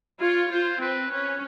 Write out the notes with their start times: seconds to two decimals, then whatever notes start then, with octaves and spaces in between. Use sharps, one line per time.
0.21 F4 C#5
0.51 F4 C5
0.81 C4 B4
1.11 C#4 B4